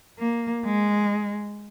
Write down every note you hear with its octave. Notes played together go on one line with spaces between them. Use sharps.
A#3
G#3